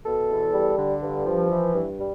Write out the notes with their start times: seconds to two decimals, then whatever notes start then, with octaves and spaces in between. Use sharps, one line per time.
0.05 B2 A4
0.30 E2
0.53 G3
0.78 D3
1.02 G2
1.26 F3
1.50 E3
1.74 G2
1.99 G3